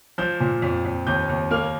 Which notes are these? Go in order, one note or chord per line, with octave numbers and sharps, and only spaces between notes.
F3 G6
A#2
F2
F2
D#2 G6
D#2
A#3 F6